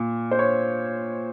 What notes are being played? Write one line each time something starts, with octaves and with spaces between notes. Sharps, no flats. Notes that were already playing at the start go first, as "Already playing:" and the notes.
Already playing: A#2
C5
C#5